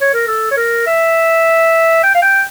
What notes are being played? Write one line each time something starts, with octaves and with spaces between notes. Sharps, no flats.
C#5
A#4
A4
C#5
A#4
E5
G5
F5
G5